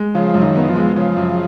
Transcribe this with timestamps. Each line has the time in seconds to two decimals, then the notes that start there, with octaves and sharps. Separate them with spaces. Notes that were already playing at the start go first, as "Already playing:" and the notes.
Already playing: G#3
0.15 C#3 F3
0.34 F#2
0.42 D#3
0.56 B3
0.68 F3
0.75 G#3
0.96 C#3 F3
1.17 F#2